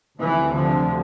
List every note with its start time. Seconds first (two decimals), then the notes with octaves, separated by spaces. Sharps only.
0.19 D2 C3 E3
0.55 D3 F3